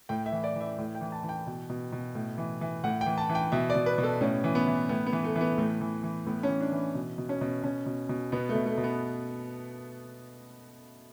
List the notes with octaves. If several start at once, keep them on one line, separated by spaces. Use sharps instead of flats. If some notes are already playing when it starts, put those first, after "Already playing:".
A2 G5
E5
E3
D5
E3
E5
A2
G5
E3
A5
E3
G5
B2
B2
B2
A2
E3
E3
A2 F#5
G5
E3
A5
E3
G5
B2 E5
D5
B2
B4
B2
A4
A2 C#4
E3
B3
E3
A2 B3
B3
E3
A3
E3
B3
A2 A3
E3
E3
A2 B3
C#4
E3
D4
E3
B2
B2
C#4
B2
B2 C#4
B2
B2
B2 B3
A3
B2
A3
B2
B3